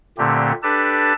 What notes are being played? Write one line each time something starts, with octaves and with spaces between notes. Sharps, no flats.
A#2 D3 A3 C4 G4
D4 G4 A4 B4 A5